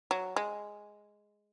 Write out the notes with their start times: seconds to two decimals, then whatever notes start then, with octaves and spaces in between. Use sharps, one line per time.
0.11 F#3
0.36 G#3